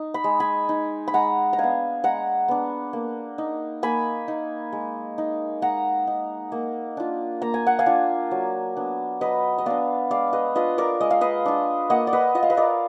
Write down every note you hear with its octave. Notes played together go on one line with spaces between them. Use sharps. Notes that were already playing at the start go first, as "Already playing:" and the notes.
Already playing: D#4
B5
G#3
G#5 B5
D#4
B5
G#3 F#5 A#5
A#5
B3 D4 F5 G#5
G#3 F#5 A#5
B3 D4
A#3
D#4
A#3 G#5 B5
D#4
G#3
D#4
G#3 F#5 A#5
D#4
A#3
D4 F4
A#3 A#5
G#5
F#5
F5 G#5
D4 F4
F#3
B3 D4
F#3 B4 D#5
D#5
B3 D4 D5 F5
G#3 D5 F5
B4 D#5
D4 F4 B4 D#5
A#4 D5
G#3 D#5
F5
B4 D#5
D4 F4
A#3 D#5 F#5
D5
B4 D#5
F4 D#5
F5
B4 D#5
A#4 D5